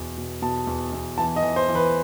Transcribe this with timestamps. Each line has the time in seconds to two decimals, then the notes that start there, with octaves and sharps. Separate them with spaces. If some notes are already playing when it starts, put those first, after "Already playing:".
Already playing: E2 B2
0.18 B2
0.42 B2 A5
0.67 E2
0.93 E2
1.18 E3 A5
1.36 D#5
1.43 E3
1.56 C5
1.69 E3
1.75 B4